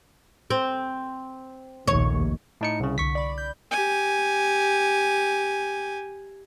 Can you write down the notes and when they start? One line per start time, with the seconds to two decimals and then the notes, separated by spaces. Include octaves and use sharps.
0.50 C4
1.88 F1 A#1 D#2 C#5
2.61 A2 D#4 C#7
2.80 C2 C#3
2.98 C2 D3 C#6 B6
3.15 D5 B5
3.38 G6
3.71 G4 G#5